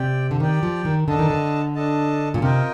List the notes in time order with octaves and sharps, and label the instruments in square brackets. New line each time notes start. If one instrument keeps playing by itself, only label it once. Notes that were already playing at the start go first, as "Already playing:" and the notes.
Already playing: [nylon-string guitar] C3 [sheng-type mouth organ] G4 D5 G5
[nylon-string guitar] D3
[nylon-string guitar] D#3 [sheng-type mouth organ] G4 D5 G5
[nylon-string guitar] F3
D#3
[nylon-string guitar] D3 [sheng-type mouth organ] D4 A4 D#5 A5
[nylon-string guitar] D#3
D3
[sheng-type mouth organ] D4 A4 D#5 A5
[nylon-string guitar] A#2
[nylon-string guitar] C3 [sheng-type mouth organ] F4 A#4 D#5 G5